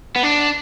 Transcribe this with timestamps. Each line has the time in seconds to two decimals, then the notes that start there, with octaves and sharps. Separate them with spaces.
0.16 B3
0.23 D4